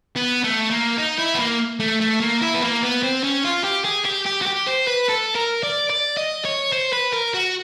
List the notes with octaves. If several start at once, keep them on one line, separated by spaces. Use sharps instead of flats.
B3
A3
A#3
D#4
E4
B3
A#3
A3
A3
A#3
E4
B3
A#3
B3
C4
C#4
F4
G4
G#4
G4
G4
F#4
G4
C5
B4
A4
A#4
D5
D5
D#5
C#5
C5
B4
A#4
F#4